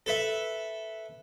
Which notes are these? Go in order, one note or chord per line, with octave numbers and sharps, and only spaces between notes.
A4 B4 E5